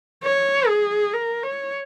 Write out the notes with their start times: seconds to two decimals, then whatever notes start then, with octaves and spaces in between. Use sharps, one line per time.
0.24 C#5
0.68 G#4
1.13 A#4
1.43 C#5